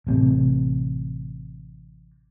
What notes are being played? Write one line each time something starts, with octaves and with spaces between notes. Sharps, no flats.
A1 C3